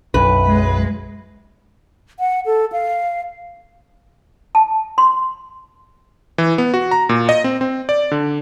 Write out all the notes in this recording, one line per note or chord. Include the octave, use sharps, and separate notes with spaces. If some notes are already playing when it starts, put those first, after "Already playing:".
B1 F#2 B4
G#3
F#5
A4
F5
A5
C6
E3
B3
F#4
A#5
A#2
D#5
C4
C4
D5
D3